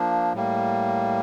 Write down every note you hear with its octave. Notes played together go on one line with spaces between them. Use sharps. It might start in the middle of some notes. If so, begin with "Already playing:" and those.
Already playing: F3 A#3 D4
A2 G3 A#3